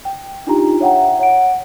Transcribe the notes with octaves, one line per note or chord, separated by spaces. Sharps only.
G5
D4 D#4 F4 G4 A#5
C#5 E5 F#5 G5 A#5
C#5 F#5 D7